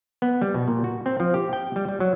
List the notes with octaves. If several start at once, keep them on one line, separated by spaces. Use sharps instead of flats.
B3
G3
B2
A#2
F#4
C4
F3
G4
G5
G3
G3
F#3